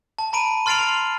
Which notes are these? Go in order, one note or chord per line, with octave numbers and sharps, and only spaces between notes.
A5
A#5 B5 D7 D#7
C6 F6 A6 C7 D7 F7
C6